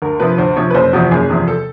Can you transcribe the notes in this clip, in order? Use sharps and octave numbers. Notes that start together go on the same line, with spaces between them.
D2 A#4
C3 F3 B4
D2 C5
C3 F3 C#5
B4
F#1 C5
E2 C3 F3 F#4
F#1 G#4
E2 C3 F3
A4